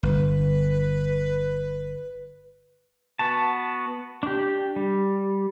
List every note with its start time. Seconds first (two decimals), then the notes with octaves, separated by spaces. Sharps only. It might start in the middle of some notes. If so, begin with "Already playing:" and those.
0.03 G1 B4
3.19 B3 F#4 A5
4.23 D4 G4
4.76 G3